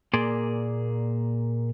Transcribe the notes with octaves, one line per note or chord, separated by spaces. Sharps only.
A#2 A#3 G#4 D5 C6